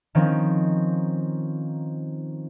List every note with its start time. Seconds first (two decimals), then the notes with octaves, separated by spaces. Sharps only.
0.15 D#3 F3 C4 C#4 D#4